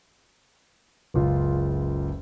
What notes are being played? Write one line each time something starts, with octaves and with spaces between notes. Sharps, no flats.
F#1 C#2 F4